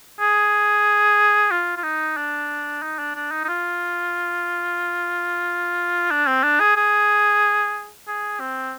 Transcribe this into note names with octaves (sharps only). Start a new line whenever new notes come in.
G#4
F4
F4
D#4
D4
D#4
D4
D4
D#4
D#4
F4
D4
C4
D4
G#4
G#4
G#4
C4